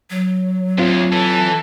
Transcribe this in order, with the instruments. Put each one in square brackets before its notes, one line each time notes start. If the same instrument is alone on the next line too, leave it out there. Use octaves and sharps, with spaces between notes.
[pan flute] F#3
[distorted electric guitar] D2 G#2 [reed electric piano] C4 F4
[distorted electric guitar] E3 [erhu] A4